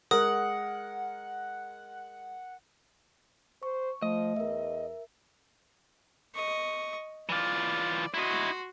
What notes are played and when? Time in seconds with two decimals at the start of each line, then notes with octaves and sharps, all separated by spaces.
0.11 G#3 A#4 F#5 D#6
3.63 C5 C#6
4.02 F3 A3 D#5
4.36 E2 A#4 E5
6.35 D#5 C#6
7.29 E3 F4 D5
8.14 E4 F#4 D#5 C6